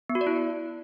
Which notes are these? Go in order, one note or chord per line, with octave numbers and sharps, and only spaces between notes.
B3
F#4
D5
E4